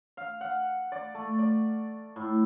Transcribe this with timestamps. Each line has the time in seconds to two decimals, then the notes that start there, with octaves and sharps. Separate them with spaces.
0.17 F5
0.41 F#5
0.92 D5
1.14 A3
1.39 D5
2.16 A2